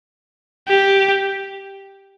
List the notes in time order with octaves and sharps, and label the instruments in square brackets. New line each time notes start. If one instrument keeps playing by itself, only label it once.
[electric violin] G4